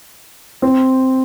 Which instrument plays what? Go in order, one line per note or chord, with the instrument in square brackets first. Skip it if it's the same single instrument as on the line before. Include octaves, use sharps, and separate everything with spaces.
[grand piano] C4